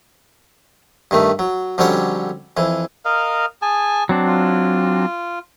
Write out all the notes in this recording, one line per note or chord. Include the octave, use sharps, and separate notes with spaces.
G2 D#3 A3
F#3
F2 D3 F#3 G3 C#4 C#5
F2 E3
A#4 D#5 F5
G#4 G#5 A5
F#3 C4 D4
F4